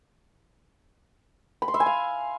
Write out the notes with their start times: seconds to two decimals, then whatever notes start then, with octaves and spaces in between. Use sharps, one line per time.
1.62 B5
1.68 C6
1.74 E5
1.80 G#5
1.86 F5